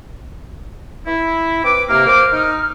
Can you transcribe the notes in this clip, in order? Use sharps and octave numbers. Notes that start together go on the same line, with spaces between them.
E4
C4 B4 D6
C3 A#3 F6
A#3 C5 D6
D#4